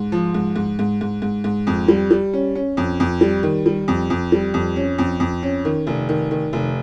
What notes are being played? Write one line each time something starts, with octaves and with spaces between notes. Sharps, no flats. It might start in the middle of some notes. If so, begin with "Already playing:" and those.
Already playing: G#2
F3
G#2
G#2
G#2
G#2
G#2
G#2
F2
G3
G3
C#4
C#4
F2
F2
G3
D#3
G3
F2
F2
G3
F2
C#4
F2
F2
C#4
D#3
F1
D#3
D#3
F1